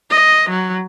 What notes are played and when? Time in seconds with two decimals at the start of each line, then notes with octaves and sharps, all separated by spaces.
0.10 D#5
0.50 F#3